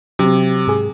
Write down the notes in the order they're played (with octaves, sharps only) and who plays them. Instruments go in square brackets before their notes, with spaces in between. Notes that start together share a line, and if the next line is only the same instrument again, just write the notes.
[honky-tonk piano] C3 [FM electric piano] F#3
[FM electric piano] G#2 G#4